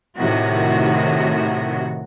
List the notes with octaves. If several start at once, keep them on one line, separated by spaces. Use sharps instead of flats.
A2 C3 D#3 F#4